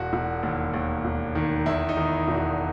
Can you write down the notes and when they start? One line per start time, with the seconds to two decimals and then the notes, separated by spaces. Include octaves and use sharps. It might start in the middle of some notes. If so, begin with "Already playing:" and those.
Already playing: E1 F#4
0.13 E1
0.43 D#2
0.74 D#2
1.05 E1
1.35 D#3
1.66 E2 E4
1.89 D#4
1.97 D#3
2.12 E4
2.28 E1
2.35 F#4